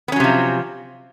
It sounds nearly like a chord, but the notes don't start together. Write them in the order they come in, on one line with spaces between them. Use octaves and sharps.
B3 C#4 F#3 C3 F3